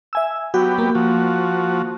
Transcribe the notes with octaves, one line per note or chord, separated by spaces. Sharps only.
E5 G#5 E6
F#3 B3 F#4 G4
A#3
F3 F#4